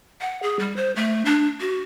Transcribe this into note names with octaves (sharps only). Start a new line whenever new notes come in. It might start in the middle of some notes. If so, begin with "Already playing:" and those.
F#5
G#4
G3
C5
A3
D4
F#4